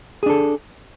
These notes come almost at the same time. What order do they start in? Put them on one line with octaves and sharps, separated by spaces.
G#4 D4 A4